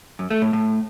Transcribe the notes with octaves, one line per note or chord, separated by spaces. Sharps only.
F#2
A3
A2
A2